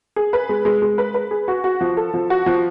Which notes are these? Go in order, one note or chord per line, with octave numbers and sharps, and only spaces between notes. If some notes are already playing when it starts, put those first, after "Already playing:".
G#4
B4
G#3
G#3
G#3
B4
B4
G#4
F#4
F#4
F3
A4
F3
F#4
F3